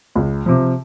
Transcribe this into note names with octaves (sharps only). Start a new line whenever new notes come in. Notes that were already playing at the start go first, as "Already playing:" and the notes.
C#2
C3 F3